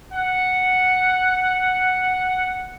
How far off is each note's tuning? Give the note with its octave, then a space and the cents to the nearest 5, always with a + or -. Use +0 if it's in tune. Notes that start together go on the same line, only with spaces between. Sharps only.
F#5 +0